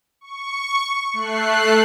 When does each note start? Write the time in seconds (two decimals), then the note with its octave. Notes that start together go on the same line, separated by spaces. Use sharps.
0.21 C#6
1.13 A3 F#6 C7